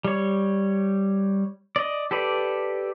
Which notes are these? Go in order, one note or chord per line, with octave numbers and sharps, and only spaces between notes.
G3 C#5
D5 D#5
G4 A4 B4 D5